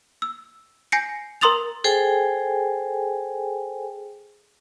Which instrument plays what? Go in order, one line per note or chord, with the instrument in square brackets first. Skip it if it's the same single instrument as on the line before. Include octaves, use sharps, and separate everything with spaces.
[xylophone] E6
G#5 G6 A#6 C7 C#7
A#4 A#5 C6 D#6 A6 F7
[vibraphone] G#4 A4 C5 G5 G#5